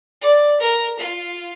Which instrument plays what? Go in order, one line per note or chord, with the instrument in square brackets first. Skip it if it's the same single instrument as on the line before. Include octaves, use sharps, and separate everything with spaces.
[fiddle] D5
A#4
F4